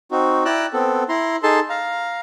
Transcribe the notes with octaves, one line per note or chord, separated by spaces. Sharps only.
C4 D#4 F#4
E4 D5 G5 A#5 E6 F#6
B3 C4 A4
E4 A#5 C6
D#4 G#4 A4 A5 C6
F5 A#5